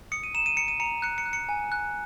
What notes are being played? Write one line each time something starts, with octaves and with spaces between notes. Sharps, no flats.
D#6 C#7
D#7
A#5 E7
D#7
A#5 C#7
D#7
A#5 C#7
F#6 C#7
C#7
F#6
C#7
G#5
F#6